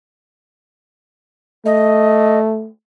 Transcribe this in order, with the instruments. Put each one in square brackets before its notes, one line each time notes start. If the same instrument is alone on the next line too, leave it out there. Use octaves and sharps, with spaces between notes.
[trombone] A3 [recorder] D#5